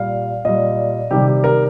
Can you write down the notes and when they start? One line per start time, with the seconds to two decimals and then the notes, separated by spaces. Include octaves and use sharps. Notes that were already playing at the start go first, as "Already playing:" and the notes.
Already playing: A#2 G3 F5
0.45 A#2 G3 D#5
1.11 C3 D#3 G3 G4
1.27 G4
1.44 A#4